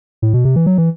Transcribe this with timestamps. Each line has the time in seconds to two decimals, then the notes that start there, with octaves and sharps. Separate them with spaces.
0.22 A2
0.34 B2
0.45 C3
0.56 E3
0.66 F#3
0.78 E3